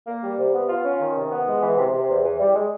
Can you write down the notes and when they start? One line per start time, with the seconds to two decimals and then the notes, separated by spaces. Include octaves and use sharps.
0.07 A#3
0.23 G3
0.39 C3
0.54 B3
0.69 F4
0.85 C#4
1.00 D#3
1.16 C3
1.32 B3
1.47 G#3
1.63 E3
1.78 C3
1.94 C3
2.09 E2
2.25 E3
2.40 G3
2.55 G#3